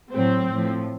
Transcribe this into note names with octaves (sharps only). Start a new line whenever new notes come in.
A2 F#3 C4
A2 F3